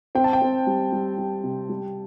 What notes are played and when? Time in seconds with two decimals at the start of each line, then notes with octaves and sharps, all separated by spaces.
0.15 C4 G5
0.24 A5
0.33 G5
0.41 C4
0.67 G3
0.92 G3
1.18 G3
1.43 C3
1.69 G3